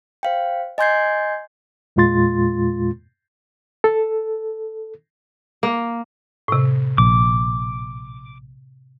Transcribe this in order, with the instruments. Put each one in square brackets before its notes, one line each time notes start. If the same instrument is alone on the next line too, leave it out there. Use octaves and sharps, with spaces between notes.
[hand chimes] C5 F5 G5
D#5 G#5 C6 G6 G#6 C7
[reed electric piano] E2 A#2 G#3 F4 C6 A6
A4
[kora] A#3
[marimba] A2 C3
[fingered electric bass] A#1 [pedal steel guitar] D6